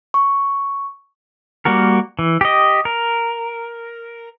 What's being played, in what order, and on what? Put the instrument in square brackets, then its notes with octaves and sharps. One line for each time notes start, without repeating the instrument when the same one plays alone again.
[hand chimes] C#6
[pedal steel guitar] G3 A#3 F#4 A#4
E3
G4 D#5
A#4